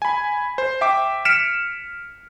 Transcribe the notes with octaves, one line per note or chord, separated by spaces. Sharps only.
G#5 B5
C5
E5 G5 D6
F6 B6 C#7 D7 E7